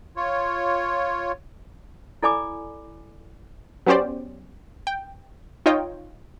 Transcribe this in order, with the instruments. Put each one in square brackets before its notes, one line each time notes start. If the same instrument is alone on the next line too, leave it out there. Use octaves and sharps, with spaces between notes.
[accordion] F4 C#5
[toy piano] E4 A4 D5 G#5 B5 D6
[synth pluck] F#3 B3 C#4 G4 C5 D5
G5
D#4 F4 C#5 D#5 G5